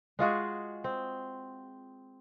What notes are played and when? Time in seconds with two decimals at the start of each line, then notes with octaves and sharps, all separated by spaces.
0.19 G#3 F4 F#4 G#4
0.84 C4